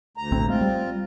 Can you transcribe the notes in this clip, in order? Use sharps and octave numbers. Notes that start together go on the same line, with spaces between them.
D2 A#5
A#1 A2 C4
G#3 A3 C4 F4
G3